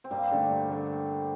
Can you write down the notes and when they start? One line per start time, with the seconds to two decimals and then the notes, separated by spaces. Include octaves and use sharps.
0.04 C4
0.11 G2 G3 A#3
0.31 D3 A3 D4
0.50 G2
0.69 D3 A3 D4